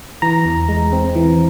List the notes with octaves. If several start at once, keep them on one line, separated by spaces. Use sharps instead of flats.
E3 A#5
E2
G#3
C4
E3